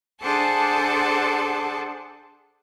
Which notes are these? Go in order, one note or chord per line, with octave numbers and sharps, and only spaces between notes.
D4 G#4 A4 C5 F#5 A5